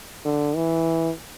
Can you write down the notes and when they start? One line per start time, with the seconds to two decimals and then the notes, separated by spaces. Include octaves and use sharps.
0.25 D3
0.56 E3